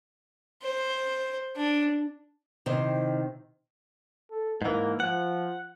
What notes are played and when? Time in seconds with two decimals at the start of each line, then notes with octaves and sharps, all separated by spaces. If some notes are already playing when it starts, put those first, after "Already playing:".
0.63 C5
1.57 D4
2.66 C3 D#3 E4 C5
4.31 A4
4.62 G#2 E3 A#3
5.00 F3 F#5